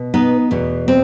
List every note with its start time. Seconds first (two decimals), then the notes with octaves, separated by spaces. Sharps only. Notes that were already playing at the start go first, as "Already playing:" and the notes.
Already playing: B2
0.14 B3 D#4
0.51 E2 B2 A3
0.88 C4